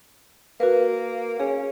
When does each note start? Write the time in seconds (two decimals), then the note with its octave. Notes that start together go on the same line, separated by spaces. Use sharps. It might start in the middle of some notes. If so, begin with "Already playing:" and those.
0.60 A#3 F#4 A#4 B4
1.40 C#4 G#4